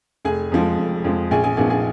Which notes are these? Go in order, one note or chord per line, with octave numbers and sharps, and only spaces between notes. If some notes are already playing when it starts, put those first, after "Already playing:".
F1 G#4 G#5
F2 F3 G#3
F1
F2 F3 G#3
A#1 G#4 G#5
G#4 G#5
A#2 F3 B3 D#4 G#4 G#5
G#4 G#5